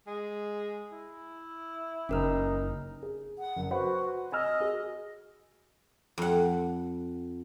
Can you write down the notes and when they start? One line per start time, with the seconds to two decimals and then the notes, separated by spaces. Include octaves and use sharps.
0.07 G#3
0.92 E4
2.09 F#1 C#4 D#4 A#4 F6
3.03 G#4
3.39 F#5
3.56 F#1
3.71 F#4 B4 C5 F#5
4.32 D#5 G#5 E6 F6
4.60 F#4 G#4
6.18 F2 F#5